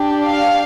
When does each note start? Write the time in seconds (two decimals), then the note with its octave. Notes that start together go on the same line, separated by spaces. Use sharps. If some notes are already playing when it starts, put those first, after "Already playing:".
Already playing: D4 G4
0.27 F5